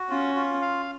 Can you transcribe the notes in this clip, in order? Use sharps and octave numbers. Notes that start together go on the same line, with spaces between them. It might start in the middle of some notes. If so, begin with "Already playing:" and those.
Already playing: F#4
C#4 F4
F4
F5